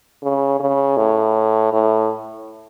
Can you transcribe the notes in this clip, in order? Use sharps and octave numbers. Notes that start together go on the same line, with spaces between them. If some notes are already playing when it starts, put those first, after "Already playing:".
C#3
C#3
A2
A2